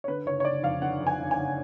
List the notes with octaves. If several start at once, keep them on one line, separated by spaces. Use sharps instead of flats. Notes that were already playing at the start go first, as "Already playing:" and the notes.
C#5
D3 B4
F#1 C#5
C#5
F#1 D5
F2 F5
D3 F#5
F2
G#5
F#1
G#5
F#1